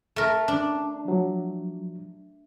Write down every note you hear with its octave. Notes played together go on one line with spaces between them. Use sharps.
A3 A#4
D4
F3 F#3